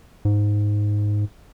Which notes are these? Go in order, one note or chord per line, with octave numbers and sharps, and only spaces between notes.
G#2